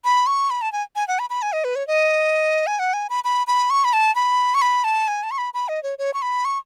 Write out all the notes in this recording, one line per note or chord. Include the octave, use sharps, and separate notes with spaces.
B5
C#6
B5
A5
G#5
G#5
F#5
B5
B5
G#5
D#5
B4
C#5
D#5
G#5
F#5
G#5
B5
B5
B5
C#6
B5
A5
B5
C#6
B5
A5
G#5
A5
C#6
B5
B5
D#5
C#5
C#5
C#6
B5
C#6